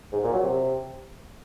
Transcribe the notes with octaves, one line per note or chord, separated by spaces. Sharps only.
G#2
A#2
F#3
C3